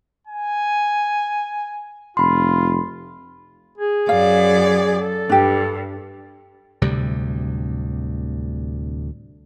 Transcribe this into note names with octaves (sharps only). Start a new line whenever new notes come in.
G#5
F1 F4 B5 C6
G#4
F#2 D5 F5
A4
G2 D4 G4
D1 D2 C3 G3